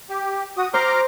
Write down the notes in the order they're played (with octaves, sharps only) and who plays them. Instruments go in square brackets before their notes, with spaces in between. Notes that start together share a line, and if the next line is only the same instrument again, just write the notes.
[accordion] G4
F#4 D#6
[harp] C5 [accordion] A#5 D6 F6